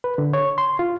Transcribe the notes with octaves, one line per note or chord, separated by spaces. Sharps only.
B4
D3
C#5
C6
F4